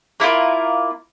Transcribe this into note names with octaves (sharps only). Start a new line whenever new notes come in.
A#3 E4 F4 A#4